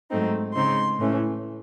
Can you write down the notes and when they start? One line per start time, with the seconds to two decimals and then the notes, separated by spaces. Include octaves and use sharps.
0.10 G#2 F#3 A3 C4 D#4
0.54 C#3 G#3 C4 D#4 C6
0.98 A2 E3 A3 C#4